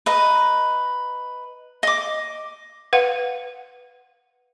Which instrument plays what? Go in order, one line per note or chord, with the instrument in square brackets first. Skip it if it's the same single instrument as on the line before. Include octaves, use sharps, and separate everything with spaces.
[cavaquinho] B4 D#5 A#5
D#5 D6
[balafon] B4 F5 F#5